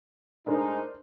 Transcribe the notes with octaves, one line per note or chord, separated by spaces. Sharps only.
A2 G#3 D4 D#4 A#4 C5